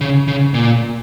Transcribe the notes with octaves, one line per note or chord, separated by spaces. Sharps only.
C#3
C#3
A#2